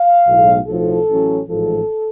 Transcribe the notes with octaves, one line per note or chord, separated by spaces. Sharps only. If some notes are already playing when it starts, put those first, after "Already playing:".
Already playing: F5
B1 A2 G#3
B1 A2 F3 A4
A1 A2 F#3 C#4
A1 G#2 F3 A4